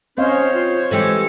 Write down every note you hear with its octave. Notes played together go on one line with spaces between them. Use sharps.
C4 C#4 C5 C#5 D#5 F5
F4
E3 G#3 G4 A4